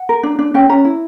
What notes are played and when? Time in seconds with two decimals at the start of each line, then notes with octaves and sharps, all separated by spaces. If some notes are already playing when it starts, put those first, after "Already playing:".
Already playing: F#5
0.09 A#4
0.23 D4
0.39 D4
0.54 C#4 G5
0.69 C#4 A#5
0.85 E4